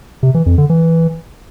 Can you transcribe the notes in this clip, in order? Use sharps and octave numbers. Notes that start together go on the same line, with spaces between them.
C3
E3
F2
D3
E3